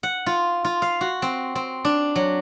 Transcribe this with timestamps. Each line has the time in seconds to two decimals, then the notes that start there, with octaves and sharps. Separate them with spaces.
0.03 F#5
0.26 F4
0.65 F4
0.82 F5
1.01 F#4
1.22 C4
1.55 C4
1.85 D4
2.16 F#3